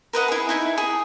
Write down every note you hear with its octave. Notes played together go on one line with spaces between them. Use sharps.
A#4 B4 D#5 F#5
E4 G#4
D#4 E4 E5
G#4